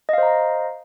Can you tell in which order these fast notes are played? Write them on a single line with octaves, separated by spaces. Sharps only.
D#5 F5 C5 A#5